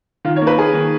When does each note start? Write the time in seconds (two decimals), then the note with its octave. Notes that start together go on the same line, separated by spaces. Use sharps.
0.25 D#3 F4
0.36 C#5
0.42 A#3
0.47 B4
0.58 A#3 G#4
0.74 D#3